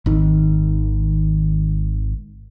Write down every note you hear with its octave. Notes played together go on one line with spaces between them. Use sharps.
G#1 D#3